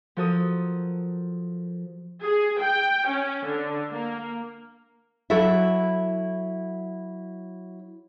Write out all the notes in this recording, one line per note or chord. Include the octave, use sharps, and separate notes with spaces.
F3 F#4 A4 A#4 D#6
G#4
G5
C#4
D3
A#3
F#3 E4 F#4 A4 E5